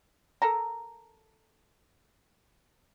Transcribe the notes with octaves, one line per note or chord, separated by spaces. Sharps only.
A4 A#4 A#5